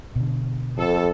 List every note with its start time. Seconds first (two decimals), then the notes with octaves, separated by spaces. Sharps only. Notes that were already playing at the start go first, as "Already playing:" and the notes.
0.16 B2 D3
0.78 F2 A4